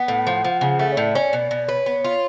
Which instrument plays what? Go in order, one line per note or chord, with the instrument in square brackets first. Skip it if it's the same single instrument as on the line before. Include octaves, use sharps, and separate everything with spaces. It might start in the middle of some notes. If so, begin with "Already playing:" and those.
Already playing: [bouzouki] B3 [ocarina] F#5
[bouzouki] A2
F3
F3
C#3
A3
[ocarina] C#5
[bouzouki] A2 [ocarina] D5
[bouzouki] C#4
B2
B2
[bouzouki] B4 [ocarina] C#5
[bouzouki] B3
F4